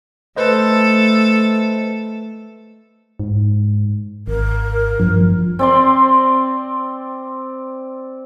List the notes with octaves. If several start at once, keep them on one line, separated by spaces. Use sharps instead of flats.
A3 A4 B4 C5 D#5
G#2
G#1 A#4
G2 F3
C4 D5 C6